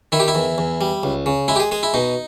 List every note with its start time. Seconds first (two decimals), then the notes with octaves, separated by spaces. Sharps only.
0.12 D#3 E4
0.20 G4
0.28 E4
0.35 E2
0.58 E2
0.81 G3
1.03 C#2
1.26 C#3
1.48 G#3 E4
1.56 G4
1.60 G#4
1.71 G#3 G#4
1.83 E4
1.94 B2 D#4